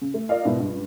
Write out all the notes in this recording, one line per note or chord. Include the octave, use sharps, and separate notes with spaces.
C#3
A3
F4 A#4 D5 D#5 F5
G#2 B2 E4
C#2 G2